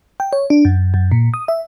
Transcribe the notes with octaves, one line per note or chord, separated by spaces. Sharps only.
G5
C#5
D4
F#2
F#2
A#2
D#6
E5